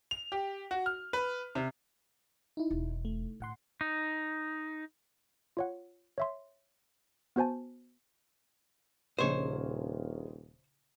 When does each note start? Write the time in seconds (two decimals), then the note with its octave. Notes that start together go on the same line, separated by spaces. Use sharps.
0.11 F7
0.32 G4
0.71 F#4
0.86 F6
1.13 B4
1.55 C3
2.57 D#4 E4
2.70 E1 D#2
3.05 A3
3.40 A2 D3 F#5 C6
3.81 D#4
5.57 F4 C#5 F#5
6.18 C#5 E5 C6
7.36 B3 F#4 C5 G#5 A5
9.19 D#1 A#1 C#3 C5 C#5 D#5